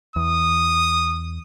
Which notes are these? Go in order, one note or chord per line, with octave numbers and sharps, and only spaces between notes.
E2 D#6